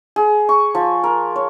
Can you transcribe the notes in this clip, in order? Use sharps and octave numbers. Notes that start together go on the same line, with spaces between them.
G#4
C#6
F3
A#4
C#5